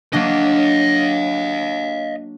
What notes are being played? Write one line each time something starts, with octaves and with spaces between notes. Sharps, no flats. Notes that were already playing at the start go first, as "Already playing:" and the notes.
F#3 A#3 D4 D#5 F5